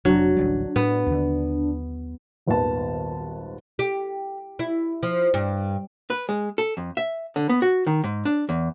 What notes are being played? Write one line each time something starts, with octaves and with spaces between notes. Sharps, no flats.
F1 C3 F#3 D4
A1 D2 G3
A2 B3
D#2 D3
D#1 G#1 D#2 B3 A5
G4
E4
F3
G2
B4
G#3
A4
F2
E5
D3
B3
F#4
D#3
G#2
D4
E2